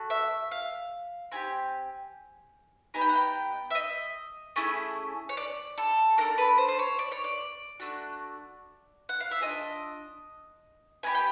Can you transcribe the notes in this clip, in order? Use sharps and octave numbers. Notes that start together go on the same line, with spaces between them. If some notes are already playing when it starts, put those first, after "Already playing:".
Already playing: A3 F#4
E5
F5
C4 E4 G4 G#5
B3 D#4 G4 G#5
G5
F#5
G5
E5
D#5
A3 C#4 E4 G#4
C#5
D5
A4
D4 F#4 A4 A#4
B4
C5
C5
C#5
D5
C#5
D5
A3 D4 F#4
F#5
F5
E5
D4 F4 G#4 D#5
B3 D#4 G4 G#5
G5